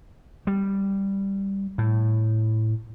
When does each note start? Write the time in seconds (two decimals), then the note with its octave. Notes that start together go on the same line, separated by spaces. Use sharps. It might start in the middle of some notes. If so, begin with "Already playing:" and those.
0.47 G3
1.78 A2